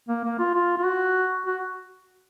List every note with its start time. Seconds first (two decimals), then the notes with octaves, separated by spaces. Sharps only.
0.09 A#3
0.24 A#3
0.39 F4
0.54 F4
0.78 F4
0.85 F#4
1.46 F#4